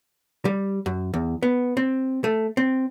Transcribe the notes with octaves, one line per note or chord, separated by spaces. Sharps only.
G3
F#2
E2
B3
C4
A3
C4